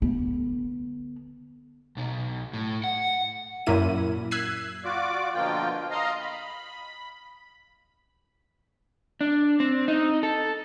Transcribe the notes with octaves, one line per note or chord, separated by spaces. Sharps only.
D3 B3
B1 B2
A2
F#5
F#2 A#2 A#3 E4 D#7
E6 F#6 G#6 B6 C7 D#7
F4 F#4 D5 D6
B2 D3 F3 A#3 F4 G5
D#5 F5 A#5 C6
B5
D4
C4
D#4
A4